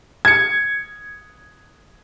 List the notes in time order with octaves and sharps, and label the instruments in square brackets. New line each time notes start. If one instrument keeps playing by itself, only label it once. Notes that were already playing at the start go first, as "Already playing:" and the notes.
[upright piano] G#6 C#7